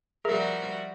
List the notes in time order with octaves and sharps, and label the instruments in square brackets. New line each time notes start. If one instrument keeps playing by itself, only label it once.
[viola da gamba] F3 G3 F#4 [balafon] G#4 [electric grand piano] A#4 E5 A#6